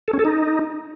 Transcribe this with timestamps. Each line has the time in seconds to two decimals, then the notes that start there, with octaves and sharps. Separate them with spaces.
0.08 A4
0.13 C#4
0.19 A4
0.25 D#4